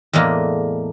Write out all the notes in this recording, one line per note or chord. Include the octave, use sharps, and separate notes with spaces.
E2 A2 G#3 A#3 D4